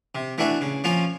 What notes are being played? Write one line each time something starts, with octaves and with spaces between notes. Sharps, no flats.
C3
E3 A3 D4 F#4
C#3
F3 A#3 C#4 F4